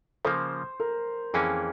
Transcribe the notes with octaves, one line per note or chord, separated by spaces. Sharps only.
C#3 F3 A#3 C5
A#4
F2 E3 A#3 C#4 G#4